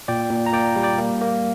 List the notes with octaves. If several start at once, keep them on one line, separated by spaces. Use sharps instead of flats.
A#2 D5 G5
A#2
A#5
A#3 D5 G5
G3
D5 G5
A#3
A#3